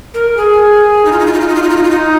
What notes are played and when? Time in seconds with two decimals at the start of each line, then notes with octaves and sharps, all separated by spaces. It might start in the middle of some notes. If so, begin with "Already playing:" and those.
0.14 A#4
0.37 G#4
1.05 D#4
1.12 F4
1.20 D#4
1.27 F4
1.33 D#4
1.41 F4
1.49 D#4
1.56 F4
1.63 D#4
1.70 F4
1.77 D#4
1.84 F4
1.91 D#4